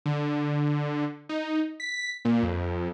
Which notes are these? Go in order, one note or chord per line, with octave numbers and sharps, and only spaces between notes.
D3
D#4
B6
A#2
F2